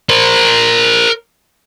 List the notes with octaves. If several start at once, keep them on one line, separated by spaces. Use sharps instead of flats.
A#4 C5